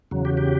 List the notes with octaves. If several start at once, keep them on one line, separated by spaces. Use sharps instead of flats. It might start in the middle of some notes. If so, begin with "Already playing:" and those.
E2 C#3 F#3
G4
G4